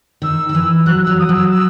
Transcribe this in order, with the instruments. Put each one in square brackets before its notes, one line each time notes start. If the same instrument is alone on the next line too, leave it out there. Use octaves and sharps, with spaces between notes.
[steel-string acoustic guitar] D#3 [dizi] E6
[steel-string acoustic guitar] D#3
E3
[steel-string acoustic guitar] F#3 [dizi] F#6
[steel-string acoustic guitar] F#3 [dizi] E6
[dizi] D#6
[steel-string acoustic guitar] F#3 [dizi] E6
[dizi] E6